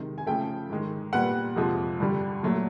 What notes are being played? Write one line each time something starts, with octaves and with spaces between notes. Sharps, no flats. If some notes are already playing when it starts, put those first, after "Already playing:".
Already playing: C3 D#3 G#3
G#5
C#3 F3 A3 G5
G#2 D#3 G#3
A#2 G3 B3 F#5
F2 C3 F3 G#3
G2 D3 G3
A#2 F#3 A3